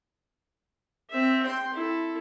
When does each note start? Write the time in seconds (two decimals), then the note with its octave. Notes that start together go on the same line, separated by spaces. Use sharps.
1.10 C4 E5
1.43 G5 C6
1.74 E4 A4